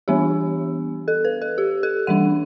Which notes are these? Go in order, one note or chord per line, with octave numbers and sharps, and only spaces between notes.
E3 G3 B3 D4 G4
A4
B4
A4
G4
A4
E3 G3 D4 F#5